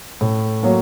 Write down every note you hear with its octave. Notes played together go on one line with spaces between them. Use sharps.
A2
F#3 A#3